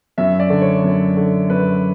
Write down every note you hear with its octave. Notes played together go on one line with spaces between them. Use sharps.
F#2 E5
D5
D3
C#5
F#2
D3
F#2 B4